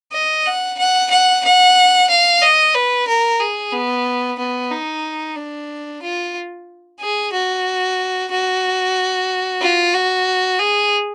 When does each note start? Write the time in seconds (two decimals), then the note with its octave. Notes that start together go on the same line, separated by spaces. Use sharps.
0.12 D#5
0.46 F#5
0.79 F#5
1.10 F#5
1.44 F#5
2.10 F5
2.42 D#5
2.75 B4
3.07 A#4
3.40 G#4
3.73 B3
4.39 B3
4.71 D#4
5.36 D4
6.02 F4
7.00 G#4
7.32 F#4
8.31 F#4
9.62 F4
9.94 F#4
10.60 G#4